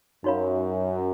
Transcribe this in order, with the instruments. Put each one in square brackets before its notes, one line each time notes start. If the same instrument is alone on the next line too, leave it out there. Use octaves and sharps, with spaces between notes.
[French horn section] F#2 [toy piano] D#4 F#4 C#5 F5 B5